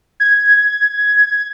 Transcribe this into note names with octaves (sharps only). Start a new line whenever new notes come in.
G#6